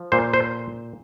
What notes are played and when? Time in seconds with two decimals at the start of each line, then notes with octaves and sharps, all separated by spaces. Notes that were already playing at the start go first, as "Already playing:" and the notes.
Already playing: F3
0.12 A#2 C5
0.34 C5